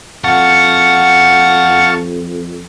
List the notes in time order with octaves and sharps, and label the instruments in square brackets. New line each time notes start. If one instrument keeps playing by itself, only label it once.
[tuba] F2 [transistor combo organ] F5 A5 C#6 [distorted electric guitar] F#5